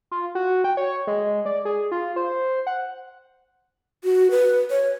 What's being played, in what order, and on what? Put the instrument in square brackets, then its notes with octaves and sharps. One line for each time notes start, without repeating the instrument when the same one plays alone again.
[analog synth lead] F4
F#4
G5
C#5
G#3
D5
G#4
F4
C5
F#5
[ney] F#4
B4
C#5